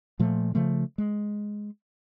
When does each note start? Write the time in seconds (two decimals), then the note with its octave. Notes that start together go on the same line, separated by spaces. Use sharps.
0.19 A#2 F3 A3
0.55 C#3 F3 A3
0.98 G#3